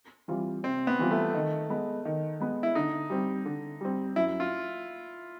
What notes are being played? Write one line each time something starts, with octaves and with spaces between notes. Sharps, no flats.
E3 G3 C4 F4
C3 C4
B3
E3 G3 C4 F4
A3
D#3
G#3 B3
D#3
G#3 B3
E4
D3 D#4
G3 C4
D3
G3 C4
F#2 E4
F4